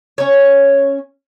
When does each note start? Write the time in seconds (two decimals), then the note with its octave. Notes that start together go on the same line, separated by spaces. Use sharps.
0.18 C#4 C#5